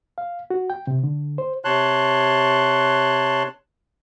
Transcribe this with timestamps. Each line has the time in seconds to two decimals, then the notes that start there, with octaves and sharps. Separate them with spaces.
0.18 F5
0.50 F#4
0.70 G5
0.87 C3
1.03 D3
1.38 C5
1.64 C3 C#5 A5 C6 F#6